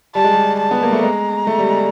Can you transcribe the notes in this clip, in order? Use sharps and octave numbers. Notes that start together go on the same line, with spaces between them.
G3 A5
G#3
G3
A5
B3
A#3
A3
G#3 A#5
A3
G3
G#3